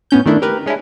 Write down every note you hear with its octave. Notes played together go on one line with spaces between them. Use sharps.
A2 B3 C#4 G6
D#3 A3 D4 E4
G4 A#4 B4
G#3 C#4 D4 E4